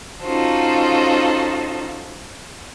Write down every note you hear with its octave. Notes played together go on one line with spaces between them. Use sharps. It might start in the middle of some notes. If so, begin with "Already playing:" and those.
C#4 D#4 F4 F#4 A4 C5